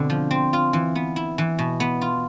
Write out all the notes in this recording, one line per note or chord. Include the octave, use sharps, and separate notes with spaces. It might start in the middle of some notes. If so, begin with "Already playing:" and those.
Already playing: B2 D3 C4
F3
C4
F4
E3
B3
E4
E3
B2
B3
F4